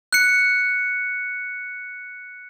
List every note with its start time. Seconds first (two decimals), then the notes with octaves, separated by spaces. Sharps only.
0.13 F#6 C#7